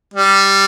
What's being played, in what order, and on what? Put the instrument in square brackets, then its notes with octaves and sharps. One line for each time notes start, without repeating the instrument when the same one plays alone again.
[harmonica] G3